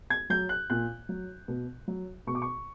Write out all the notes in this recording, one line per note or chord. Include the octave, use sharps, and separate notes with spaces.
G#6
F#3 G6
F#6
A#2 F#6
F#3
B2
F#3
B2 C#6
D6
C#6